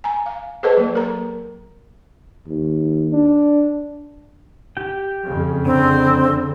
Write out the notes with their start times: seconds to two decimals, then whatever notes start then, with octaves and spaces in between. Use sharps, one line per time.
0.04 G#5 A#5
0.26 F5
0.63 G#4 A4 B4 C5 D#5 A5
0.77 F#3 A#3
0.95 A#4 A#5
2.47 D#2
3.13 D4
4.77 G4 G5
5.24 F2 C#3
5.65 D3 C4